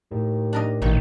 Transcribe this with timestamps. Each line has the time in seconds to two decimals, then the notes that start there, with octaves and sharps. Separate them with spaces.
0.12 D#2 A2
0.53 D4 A#4 D#5
0.82 A1 A#2 D#3